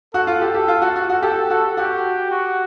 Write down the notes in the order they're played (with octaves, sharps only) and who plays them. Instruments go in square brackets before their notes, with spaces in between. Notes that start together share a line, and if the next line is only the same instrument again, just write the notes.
[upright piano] F#4 [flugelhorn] A4
[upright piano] F4
G4
G4
F4
F#4
F#4
F#4
[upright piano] G4 [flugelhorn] A4
[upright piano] F#4
[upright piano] F#4 [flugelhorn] G4
[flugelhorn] F#4